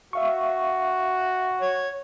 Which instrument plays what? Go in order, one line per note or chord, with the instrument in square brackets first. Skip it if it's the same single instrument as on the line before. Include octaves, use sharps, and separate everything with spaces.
[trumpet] F#4 [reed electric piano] E5 F5 C#6
[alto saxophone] C#5